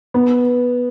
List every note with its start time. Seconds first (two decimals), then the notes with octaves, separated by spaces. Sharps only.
0.14 B3